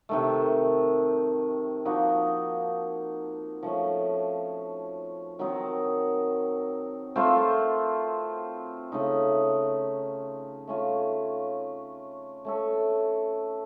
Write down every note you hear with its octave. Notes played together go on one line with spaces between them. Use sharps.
C3 D#3 A3
F3 A#3 D#4 F#4
F3 A3 C#4
D#3 F#3 C4 D#4
A3 C4 F4 C5
C#3 A3 D#4
A3 C#4 F4
A3 C#4 A4